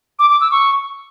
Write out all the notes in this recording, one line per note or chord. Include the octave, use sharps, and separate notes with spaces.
D6
D6
E6
C#6